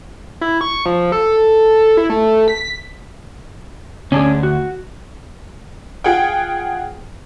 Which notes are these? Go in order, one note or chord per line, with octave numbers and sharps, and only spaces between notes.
E4
C#6
F3
A4
E4
A3
B6
D2 C#4 D4 G#4
F#4
F4 G#4 F#5 G5